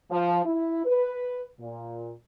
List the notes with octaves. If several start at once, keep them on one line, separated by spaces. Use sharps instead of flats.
F3
E4
B4
A#2